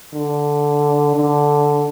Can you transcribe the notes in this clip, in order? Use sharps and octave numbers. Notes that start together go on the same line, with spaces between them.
D3
D3